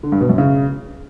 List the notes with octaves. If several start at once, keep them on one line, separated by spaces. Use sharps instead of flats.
D3
G2
B2
F#2
C#3